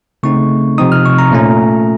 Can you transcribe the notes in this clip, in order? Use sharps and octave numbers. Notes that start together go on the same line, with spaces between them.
C#3 A3 C4 D#4 C#6
C3 F3 C4 D#4 D#6
F6
C#6
A#5
A#2 A3 C#4